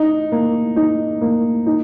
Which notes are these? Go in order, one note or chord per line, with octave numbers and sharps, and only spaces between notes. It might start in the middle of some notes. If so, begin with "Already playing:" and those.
Already playing: D#4
A#3
D#4
A#3
D#4